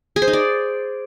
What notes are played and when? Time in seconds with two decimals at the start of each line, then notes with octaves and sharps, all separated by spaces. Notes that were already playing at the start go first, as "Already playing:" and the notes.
0.16 G#4
0.22 C5
0.28 D#4
0.33 D5